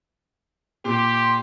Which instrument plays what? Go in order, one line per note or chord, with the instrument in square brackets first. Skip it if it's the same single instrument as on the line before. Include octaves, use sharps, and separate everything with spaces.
[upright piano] A#2 [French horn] G4 [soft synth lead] C6